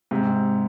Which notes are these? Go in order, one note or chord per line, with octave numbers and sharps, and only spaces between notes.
G#2 C3